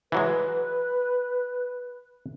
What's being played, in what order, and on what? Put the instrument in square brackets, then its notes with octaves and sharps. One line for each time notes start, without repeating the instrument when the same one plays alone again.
[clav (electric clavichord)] E3 F#3 G#3 [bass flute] B4